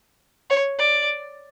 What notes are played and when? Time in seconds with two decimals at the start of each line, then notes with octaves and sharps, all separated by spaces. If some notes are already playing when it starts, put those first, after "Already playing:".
0.50 C#5
0.79 D5